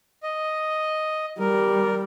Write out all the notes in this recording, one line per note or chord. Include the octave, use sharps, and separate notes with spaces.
D#5
G3 A#4